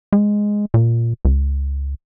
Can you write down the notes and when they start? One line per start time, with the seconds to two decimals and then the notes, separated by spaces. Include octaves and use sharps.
0.13 G#3
0.74 A#2
1.25 C#2